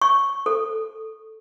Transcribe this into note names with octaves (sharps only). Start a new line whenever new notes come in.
C#6
A4